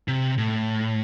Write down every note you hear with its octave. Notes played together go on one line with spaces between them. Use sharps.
C3
A2